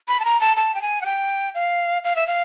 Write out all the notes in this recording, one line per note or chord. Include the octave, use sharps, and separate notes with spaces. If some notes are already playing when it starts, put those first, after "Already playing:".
B5
A5
A#5
A5
A5
G5
G#5
F#5
G5
F5
F5
E5
F5